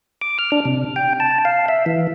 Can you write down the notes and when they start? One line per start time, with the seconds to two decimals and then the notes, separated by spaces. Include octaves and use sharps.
0.21 D6
0.39 F6
0.52 D4
0.65 C3
0.96 G5
1.20 A5
1.45 F5
1.68 E5
1.86 E3